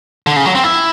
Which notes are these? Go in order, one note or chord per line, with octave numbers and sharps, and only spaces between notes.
D3
C#3
F#3
C4
E4